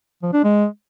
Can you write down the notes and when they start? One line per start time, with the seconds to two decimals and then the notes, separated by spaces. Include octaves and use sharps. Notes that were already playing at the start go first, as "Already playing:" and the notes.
0.23 F3
0.33 D4
0.44 G#3